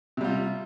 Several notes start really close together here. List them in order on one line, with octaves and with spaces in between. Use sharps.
C3 G3 F4